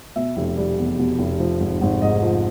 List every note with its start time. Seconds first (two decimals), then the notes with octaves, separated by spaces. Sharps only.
0.16 B2 E5
0.37 F1
0.57 G3
0.78 E2
0.99 B2
1.19 F1
1.40 F3
1.60 G#1
1.81 G#1
2.02 G#2 D#5
2.22 F3